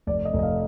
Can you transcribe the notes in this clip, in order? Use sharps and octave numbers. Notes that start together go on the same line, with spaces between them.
F1 D5
D#5
F1
D#5
F5